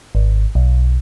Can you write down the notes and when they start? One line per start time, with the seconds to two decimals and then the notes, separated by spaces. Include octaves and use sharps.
0.15 G#1
0.55 B1